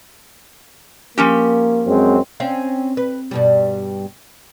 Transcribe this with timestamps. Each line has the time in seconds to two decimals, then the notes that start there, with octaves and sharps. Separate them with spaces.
1.18 F3 A#3 C#4 G4
1.87 F#2 G#3 C4
2.40 C4 C#4 F5
2.97 B4
3.31 G2 B2 G3